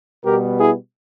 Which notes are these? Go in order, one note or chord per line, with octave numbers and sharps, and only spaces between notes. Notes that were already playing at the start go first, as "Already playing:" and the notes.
B2 G3 B3 G4 A#4
E4 G#4